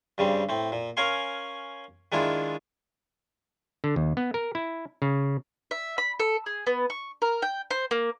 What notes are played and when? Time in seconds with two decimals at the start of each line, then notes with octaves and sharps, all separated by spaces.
0.18 G2 C#3 G3 C4
0.49 A2 C4
0.72 A#2
0.97 C#4 A#4 F5 G#5 C6
2.12 D#3 G#3 D4 E4 F4 G#4
3.84 D3
3.96 D#2
4.17 B3
4.34 A#4
4.55 E4
5.02 C#3
5.71 E5
5.98 B5
6.20 A4
6.46 G#4
6.67 B3
6.90 C#6
7.22 A#4
7.42 G5
7.71 C5
7.91 A#3